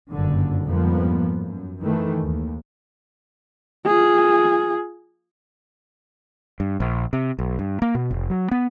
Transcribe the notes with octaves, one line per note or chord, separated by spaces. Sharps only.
F#1 G2 A#2 D3
F2 G#2 F3 G3 A#3 B3
F#2
D#3 E3 A3
D#2
F4 G#4
G2
A#1
C3
B1
G2
A#3
B2
F1
F#3
B3